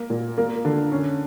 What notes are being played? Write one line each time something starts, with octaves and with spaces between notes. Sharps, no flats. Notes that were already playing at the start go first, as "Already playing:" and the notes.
Already playing: A#3
A#2
A#3
D3
C#4